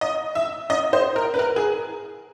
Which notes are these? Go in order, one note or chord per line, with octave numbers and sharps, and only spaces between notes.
D#5
E5
D#5
C5
A#4
B4
A#4
G#4